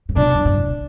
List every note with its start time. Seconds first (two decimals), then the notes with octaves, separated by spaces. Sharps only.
0.09 A2
0.16 B2 D4
0.35 A2
0.45 A2
0.54 B2